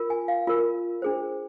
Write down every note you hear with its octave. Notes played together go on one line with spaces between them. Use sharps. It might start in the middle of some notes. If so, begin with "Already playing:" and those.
Already playing: F4 A#4
G#5
F5
F4 A#4
D4 G#4 C5